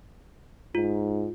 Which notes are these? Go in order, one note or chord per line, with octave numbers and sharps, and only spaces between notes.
G#2 F4